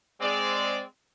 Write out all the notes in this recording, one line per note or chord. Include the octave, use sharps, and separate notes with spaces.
G#3 C4 D5